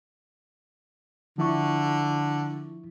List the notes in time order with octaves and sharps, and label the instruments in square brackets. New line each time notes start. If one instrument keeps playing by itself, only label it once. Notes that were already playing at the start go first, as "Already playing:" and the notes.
[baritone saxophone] D3 [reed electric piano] F3 E4 C#6